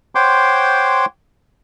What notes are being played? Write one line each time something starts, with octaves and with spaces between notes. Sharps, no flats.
C5 C#5 F#5 G5 C6 D6